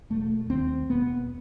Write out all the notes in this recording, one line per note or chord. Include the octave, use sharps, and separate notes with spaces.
E1 A3
D#2 C4
E1 B3